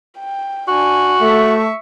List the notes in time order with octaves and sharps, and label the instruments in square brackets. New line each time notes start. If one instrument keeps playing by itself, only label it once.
[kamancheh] G5
[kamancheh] D4 G#5 [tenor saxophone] F#4
[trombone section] A3 [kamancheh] E5 C#6